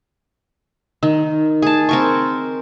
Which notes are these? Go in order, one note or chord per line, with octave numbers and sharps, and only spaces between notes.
D#3
G#4 A5
C4 A#4 C#6